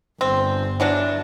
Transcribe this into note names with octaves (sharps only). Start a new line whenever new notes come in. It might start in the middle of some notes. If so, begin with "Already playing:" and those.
G1 C4
E3 F#3 D4